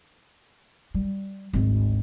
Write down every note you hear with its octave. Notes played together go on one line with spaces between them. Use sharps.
G3
G#1 D2